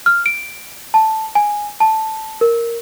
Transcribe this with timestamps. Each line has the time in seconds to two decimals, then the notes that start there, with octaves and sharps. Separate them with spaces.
0.06 F6
0.26 D7
0.94 A5
1.35 G#5
1.80 A5
2.41 A#4